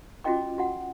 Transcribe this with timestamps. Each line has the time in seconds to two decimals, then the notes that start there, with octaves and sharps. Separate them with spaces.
0.24 C#4 F4 F#4 D#5 G5 D6
0.58 F#4 F#5